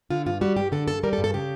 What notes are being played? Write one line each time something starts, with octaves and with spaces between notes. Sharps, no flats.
D3 F4
G2 F4
G3 F#4
G2 G4
D3 A4
G2 A4
G3 A#4
A4
G2
A4
C#3 G4